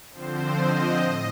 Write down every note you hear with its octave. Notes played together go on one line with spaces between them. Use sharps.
D3 F3 C4 C5
D#5
A2